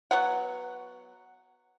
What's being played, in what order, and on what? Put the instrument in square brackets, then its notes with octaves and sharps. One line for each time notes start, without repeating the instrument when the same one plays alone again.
[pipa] F#3 B3 F#5